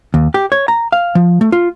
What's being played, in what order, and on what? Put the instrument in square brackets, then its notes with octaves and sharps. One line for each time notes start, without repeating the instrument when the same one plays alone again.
[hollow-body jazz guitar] D#2
G4
C#5
A#5
F5
F3
A3
F4